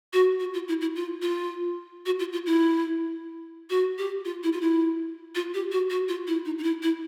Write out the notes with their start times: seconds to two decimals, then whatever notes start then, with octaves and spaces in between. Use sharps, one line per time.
0.13 F#4
0.40 F#4
0.54 F4
0.68 E4
0.81 E4
0.96 F4
1.22 F4
2.06 F#4
2.19 F4
2.33 F4
2.46 E4
3.70 F#4
3.98 G4
4.25 F4
4.43 E4
4.53 F4
4.61 E4
5.35 F4
5.54 G4
5.72 F#4
5.90 F#4
6.08 F4
6.27 E4
6.45 D#4
6.58 D#4
6.63 E4
6.83 E4